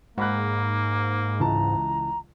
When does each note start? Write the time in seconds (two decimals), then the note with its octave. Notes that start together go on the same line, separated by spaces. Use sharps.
0.18 G#2 A#3 F#5 B5 F#6
1.40 C#2 E3 A5 A#5